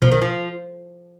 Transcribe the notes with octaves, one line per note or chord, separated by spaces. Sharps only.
B1 B2 F3
D#3
F3